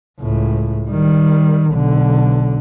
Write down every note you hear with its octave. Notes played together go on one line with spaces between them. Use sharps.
C#2 A2
D#3 G3
B1 D3